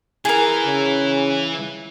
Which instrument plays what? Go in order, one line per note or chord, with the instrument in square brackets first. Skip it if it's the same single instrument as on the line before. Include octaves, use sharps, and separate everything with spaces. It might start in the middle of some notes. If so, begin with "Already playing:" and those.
[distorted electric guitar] E3 [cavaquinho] G#4 A#4
[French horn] C#3